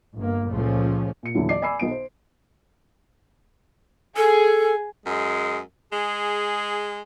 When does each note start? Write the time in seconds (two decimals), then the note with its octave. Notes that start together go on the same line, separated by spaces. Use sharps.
0.15 G1 A#3
0.50 C#2 A#2 F3 A3 C#4
1.23 A#2 C#7
1.35 E2 A#2 D3 E3 F#3
1.49 D5 D6 C7
1.62 D5 G#5 B5 D6 E6 C7
1.79 B1 B3 D7
1.91 C5
4.16 G#4 A4
5.06 F#2 G#3
5.92 G#3 G#4